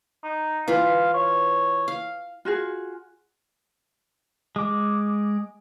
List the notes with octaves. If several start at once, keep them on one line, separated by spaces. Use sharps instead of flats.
D#4
E3 F4 B4 F5
C#5
F5
F4 F#4 G#4
G#3 D6